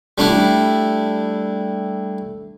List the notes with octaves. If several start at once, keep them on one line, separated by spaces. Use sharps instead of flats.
G3 A3 D4 E4